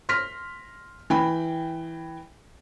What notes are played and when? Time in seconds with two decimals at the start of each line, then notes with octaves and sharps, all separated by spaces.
0.09 C6 F6 A#6 B6
1.10 E3 G5 B5